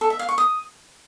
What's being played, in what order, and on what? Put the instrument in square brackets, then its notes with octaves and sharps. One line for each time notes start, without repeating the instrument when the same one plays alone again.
[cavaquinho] A4
E5
F5
C#6
D#6